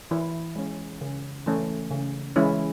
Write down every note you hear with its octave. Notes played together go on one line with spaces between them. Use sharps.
E3 E4
G#3 C#4
C#3
E3 A3 C#4
C#3
E3 G#3 C#4 E4